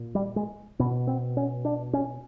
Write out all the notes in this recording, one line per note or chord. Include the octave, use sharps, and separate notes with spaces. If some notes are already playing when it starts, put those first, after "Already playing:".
Already playing: A#2
G3
G#3
B2 B3
C4
C#4
D4
C#4